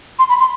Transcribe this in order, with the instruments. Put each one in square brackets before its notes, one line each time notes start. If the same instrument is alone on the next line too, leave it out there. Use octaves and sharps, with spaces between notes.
[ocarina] C6
B5
C6